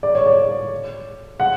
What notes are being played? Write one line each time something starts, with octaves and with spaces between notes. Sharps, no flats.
D5
C#5
D5
F#5